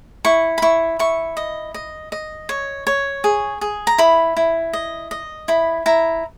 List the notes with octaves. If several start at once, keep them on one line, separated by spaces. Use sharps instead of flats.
E4 C#6
B5
E4 C#6
E4 C#6
D#5
D#5
D#5
C#5
C#5
G#4
G#4
A#5
E4 B5
E4
D#5
D#5
E4 B5
E4 A#5